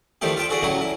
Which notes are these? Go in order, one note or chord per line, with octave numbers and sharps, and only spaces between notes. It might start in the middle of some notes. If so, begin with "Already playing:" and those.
D#3 F3 A3 D4 E4 G4
F4 E5 G5 C#6
E4 F#4 G#4 A4 D5
A2 D3 F#3 C#4 E4 A#5
E4